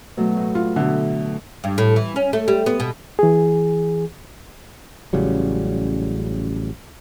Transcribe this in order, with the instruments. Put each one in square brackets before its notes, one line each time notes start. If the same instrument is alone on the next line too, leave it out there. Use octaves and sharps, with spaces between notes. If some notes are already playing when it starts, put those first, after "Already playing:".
[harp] B2 F#3 A3
A2
[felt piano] F4
[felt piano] B2 D3 [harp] E5
[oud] G2
A2
E3
C#4
A3
G3
B3
B2
[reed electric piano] E3 G#4
[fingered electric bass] A1 C#3 F#3 G3